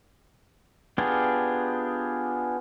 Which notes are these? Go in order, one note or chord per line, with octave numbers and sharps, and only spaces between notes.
B3 D4 F4 G4 G#4